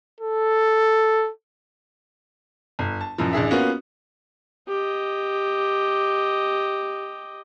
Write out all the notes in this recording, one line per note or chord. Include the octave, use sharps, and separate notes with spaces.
A4
G1
A5
A1 F#2 F3
A1 D4 G#4 E5
A#3 B3 C#4 F4 F#4
G4 D#5